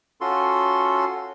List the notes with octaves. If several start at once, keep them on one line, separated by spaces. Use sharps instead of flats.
C#4 F4 F#4 A4 C6